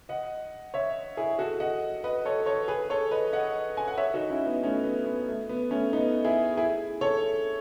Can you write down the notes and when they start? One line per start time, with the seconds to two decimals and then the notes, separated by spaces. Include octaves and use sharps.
0.09 D#5 F#5
0.74 C#5 E5
1.17 E4 G#4
1.39 F#4 A4
1.60 D#5 F#5
2.04 B4 D#5
2.25 A4 C#5
2.46 A4 C#5
2.68 G#4 B4
2.90 A4 C#5
3.11 B4 D#5
3.33 D#5 F#5
3.77 G#5
3.88 F#5
3.98 C#5 E5
4.14 D#4 F#4
4.30 C#4 E4
4.46 B3 D#4
4.62 A3 C#4
4.84 B3
5.06 B3
5.28 A3
5.49 B3
5.70 A3 C#4
5.93 B3 D#4
6.24 E4 G#4
6.57 E4 G#4
7.01 A4 C#5